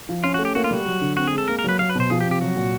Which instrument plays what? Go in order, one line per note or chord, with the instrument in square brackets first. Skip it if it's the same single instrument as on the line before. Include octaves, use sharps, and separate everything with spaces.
[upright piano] F3
[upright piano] C#4 [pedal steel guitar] F4
[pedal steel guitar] F#4
[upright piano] A3
[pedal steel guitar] G4
[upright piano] A#3 [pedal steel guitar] F#4
[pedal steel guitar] F4
[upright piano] G3 [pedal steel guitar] F#4
[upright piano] F#3
D3
[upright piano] C4 [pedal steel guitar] F#4
[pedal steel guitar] G#4
[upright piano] G#3
[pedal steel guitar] A4
[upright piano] A#3 [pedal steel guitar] A#4
[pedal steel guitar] A#4
[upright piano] F#3 [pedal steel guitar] B4
[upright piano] F#3 [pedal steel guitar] F5
[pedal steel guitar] B4
[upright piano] B2 [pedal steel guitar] C5
[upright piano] F3 [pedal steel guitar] G#4
[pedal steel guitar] G4
[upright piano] C3
[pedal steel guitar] G4
[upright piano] F#3 [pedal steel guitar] F#4
[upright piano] A#2